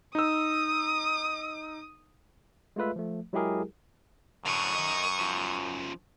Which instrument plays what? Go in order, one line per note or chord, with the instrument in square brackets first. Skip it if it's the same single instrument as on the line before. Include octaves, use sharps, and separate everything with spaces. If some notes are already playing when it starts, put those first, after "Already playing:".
[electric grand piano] D#4 E6 [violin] D#6
[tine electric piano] G#3 A3 F4 B4 E5
F3 A3
F#3 G#3 E4 G4 G#4 A#4
[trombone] F#2 [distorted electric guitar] A2 D3 [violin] C#6 D#6
[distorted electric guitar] A#4 D#5
C#3 F3